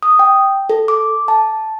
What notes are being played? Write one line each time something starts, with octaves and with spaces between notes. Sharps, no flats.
D#6
G5
A4
D6
A5